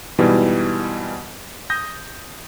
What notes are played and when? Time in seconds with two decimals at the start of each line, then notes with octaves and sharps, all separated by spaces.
0.18 G#2 B2 E3 G3
1.70 D#6 G6 A#6